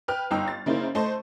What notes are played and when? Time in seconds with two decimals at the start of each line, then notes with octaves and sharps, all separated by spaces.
0.08 B4 G5 F6
0.31 G1 D#4 G5 E6
0.48 A6
0.66 C#3 A#3 D#4 E4 C5
0.95 A3 C5 D#5 A5